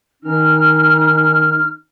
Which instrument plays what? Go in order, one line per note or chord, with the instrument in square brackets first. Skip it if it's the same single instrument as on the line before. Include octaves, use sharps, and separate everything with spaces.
[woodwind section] D#3 C#4 F6 [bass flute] D#4